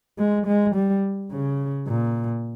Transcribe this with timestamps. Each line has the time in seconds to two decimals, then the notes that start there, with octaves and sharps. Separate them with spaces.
0.18 G#3
0.47 G#3
0.75 G3
1.32 C#3
1.88 A#2